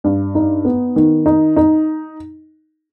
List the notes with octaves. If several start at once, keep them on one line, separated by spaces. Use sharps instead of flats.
G2
D#4
B3
D#3
D#4
D#4